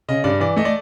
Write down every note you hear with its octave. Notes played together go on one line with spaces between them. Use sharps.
C#3 D#5
G2 D5
E3 D5
A3 D#5
D5